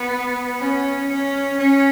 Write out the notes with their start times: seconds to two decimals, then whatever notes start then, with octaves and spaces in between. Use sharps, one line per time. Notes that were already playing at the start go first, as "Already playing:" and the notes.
Already playing: B3
0.60 C#4
1.09 C#4
1.58 C#4